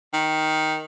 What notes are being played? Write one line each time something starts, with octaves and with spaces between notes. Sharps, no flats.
D#3